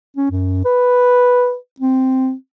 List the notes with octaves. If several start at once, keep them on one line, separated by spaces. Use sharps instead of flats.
C#4
F#2
B4
C4